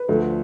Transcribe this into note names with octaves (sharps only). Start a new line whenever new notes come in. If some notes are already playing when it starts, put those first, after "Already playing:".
Already playing: B4
D2 D3 F3 A3